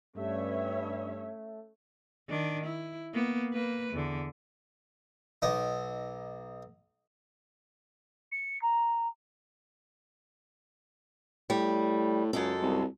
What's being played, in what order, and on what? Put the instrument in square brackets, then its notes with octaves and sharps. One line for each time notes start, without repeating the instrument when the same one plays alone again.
[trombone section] G2 [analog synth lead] A3 [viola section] C#4 C#5 E5
[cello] D#3 D4
E4
A#3 B3
A#3 B4
E2 D3
[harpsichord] B1 D#4
[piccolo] C#7
A#5
[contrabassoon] A2 [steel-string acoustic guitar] G3
[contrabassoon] C#2 [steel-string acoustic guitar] F#2 G#3 A4
[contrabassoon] C2